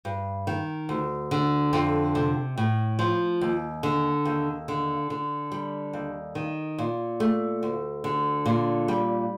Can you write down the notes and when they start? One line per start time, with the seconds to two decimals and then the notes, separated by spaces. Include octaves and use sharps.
0.05 G2
0.47 D#3
0.89 D2
1.31 D3
1.73 F2
2.15 C3
2.57 A2
2.99 F3
3.41 D#2
3.83 D3
4.25 D#2
4.68 D3
5.10 D3
5.52 G3
5.93 D#2
6.35 D#3
6.78 A#2
7.20 A3
7.63 D2
8.04 D3
8.46 A#2
8.88 G3